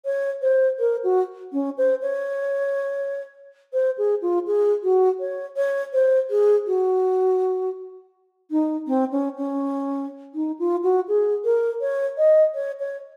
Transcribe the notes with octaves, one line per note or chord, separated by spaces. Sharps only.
C#5
C5
A#4
F#4
C#4
C5
C#5
C5
G#4
F4
G#4
F#4
C#5
C#5
C5
G#4
F#4
D#4
C4
C#4
C#4
D#4
F4
F#4
G#4
A#4
C#5
D#5
C#5
C#5